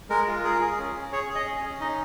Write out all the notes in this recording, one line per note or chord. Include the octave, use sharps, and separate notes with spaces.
G#3 A#4
F4
G#4 A#4
G#4
C#4
C#4
G#4 C#5
G#4
D#5
C#4
C#4
D#4 D#5